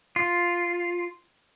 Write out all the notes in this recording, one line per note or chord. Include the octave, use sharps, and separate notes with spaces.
F4